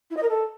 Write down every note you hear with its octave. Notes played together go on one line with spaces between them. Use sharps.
E4
D#5
A#4
A4